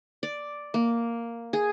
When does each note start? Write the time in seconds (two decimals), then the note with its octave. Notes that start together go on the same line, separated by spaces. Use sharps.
0.23 D5
0.74 A#3
1.53 G#4